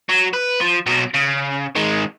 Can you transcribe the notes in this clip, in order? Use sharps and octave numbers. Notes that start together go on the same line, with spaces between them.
F#3
B4
F3
B2 F#3
C#3
D#3 G#3